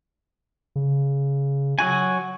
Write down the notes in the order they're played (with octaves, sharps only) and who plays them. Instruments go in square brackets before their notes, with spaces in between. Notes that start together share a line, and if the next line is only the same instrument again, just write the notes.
[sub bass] C#3
[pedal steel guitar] F#3 F#4 G#5